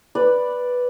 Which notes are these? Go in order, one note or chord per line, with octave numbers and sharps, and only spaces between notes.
B4 D5 B5